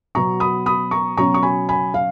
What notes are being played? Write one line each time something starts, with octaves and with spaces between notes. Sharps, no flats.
B2 F#3 B3 A#5 C#6
B5 D#6
B5 D#6
A#5 C#6
B2 F#3 C#4 A#5 C#6
C#6
G#5 B5
G#5 B5
F5